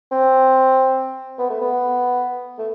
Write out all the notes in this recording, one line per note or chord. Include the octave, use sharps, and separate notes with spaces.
C4
B3
A3
B3
A3